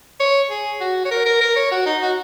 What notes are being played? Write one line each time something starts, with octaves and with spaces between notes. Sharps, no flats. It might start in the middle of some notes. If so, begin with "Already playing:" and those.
C#5
G#4
F#4
C#5
A#4
A#4
A#4
C#5
F#4
D#4
F#4